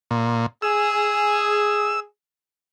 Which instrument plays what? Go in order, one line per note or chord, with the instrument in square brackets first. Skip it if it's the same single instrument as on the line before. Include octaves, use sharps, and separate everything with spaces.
[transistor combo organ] A#2
[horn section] G#4 [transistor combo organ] E6